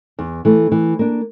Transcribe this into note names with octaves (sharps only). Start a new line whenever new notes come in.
E2
E3 A3
E3
A#3 D4